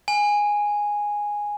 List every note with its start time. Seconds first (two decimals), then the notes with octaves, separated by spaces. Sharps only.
0.08 G#5